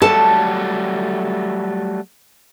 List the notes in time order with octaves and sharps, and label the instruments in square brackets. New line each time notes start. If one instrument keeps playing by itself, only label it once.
[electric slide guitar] F#3 G3 A3 [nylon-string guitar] A4 A5